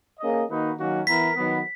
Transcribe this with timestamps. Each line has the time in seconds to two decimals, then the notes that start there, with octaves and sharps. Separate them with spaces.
0.20 A#3 C#4 G#4 D#5
0.48 D#3 A#3 D#4 F#4 B4
0.78 D#3 F#3 A#3 C#4 F#4
1.07 E3 B3 E4 A#4 B6
1.36 D#3 F#3 B3